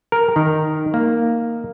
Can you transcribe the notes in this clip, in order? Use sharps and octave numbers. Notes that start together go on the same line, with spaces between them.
A#4
D#3
A#3